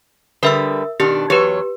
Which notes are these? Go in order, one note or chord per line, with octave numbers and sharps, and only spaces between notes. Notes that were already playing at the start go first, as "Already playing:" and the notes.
D3 G3 A#4 B4 E5 E6
B2 D#3 D4 G4
E2 F#3 G4 B4 C#5